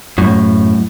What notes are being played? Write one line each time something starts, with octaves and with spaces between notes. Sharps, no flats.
F#2 A2